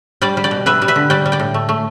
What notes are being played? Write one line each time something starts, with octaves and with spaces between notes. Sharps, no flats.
G3 D5 G5
G3
D5 G5
B2
G3 B4 E5
G3
B4 E5
D3
G3 D5 G5
G3
D5 G5
A2
A3
A3